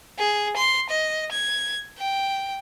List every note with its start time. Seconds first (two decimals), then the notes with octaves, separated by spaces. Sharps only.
0.18 G#4
0.56 C6
0.89 D#5
1.31 G#6
1.98 G5